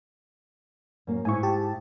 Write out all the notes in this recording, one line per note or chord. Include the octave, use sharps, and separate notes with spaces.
F#2 A#3
G#2 E4 E5 G#5 C#6
G4 A5